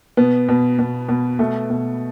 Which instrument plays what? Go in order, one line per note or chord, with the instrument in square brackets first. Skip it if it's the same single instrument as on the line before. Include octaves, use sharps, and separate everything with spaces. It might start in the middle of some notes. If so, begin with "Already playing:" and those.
[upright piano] B2 B3
B2
B2
B2
B2 A3
B2